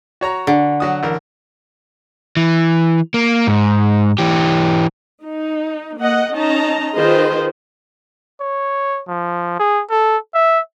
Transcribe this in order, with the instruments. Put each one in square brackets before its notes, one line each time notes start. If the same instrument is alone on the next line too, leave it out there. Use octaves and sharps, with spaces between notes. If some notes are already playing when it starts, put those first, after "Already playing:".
[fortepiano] F#4 C#5 A#5
[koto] D3
[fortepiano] F#3 F#4 D#6
A1 A#4
[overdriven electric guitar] E3
A#3
G#2
E3 G4
[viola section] D#4
A#3 D#5 F#5
C#4 D#4 D#5 A5 A#5
D#3 F4 G#4 B4 C5 D#5
[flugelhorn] C#5
F3
G#4
A4
E5